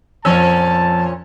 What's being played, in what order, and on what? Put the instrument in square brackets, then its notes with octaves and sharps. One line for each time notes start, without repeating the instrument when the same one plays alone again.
[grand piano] F2 E6 [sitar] A#2 F3 C#4 [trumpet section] A5